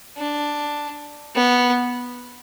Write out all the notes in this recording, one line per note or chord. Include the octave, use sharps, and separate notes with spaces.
D4
B3